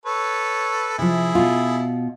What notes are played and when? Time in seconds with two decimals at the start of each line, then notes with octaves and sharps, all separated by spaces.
0.06 A4 B4 C#5
0.98 C3 F3 E4 G#4
1.35 B2 F4